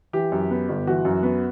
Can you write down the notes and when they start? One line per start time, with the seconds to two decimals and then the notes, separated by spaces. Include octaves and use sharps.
0.13 E3 G4
0.32 F#2
0.51 B3
0.69 G1
0.87 E3 F#4
1.05 F#2
1.23 B3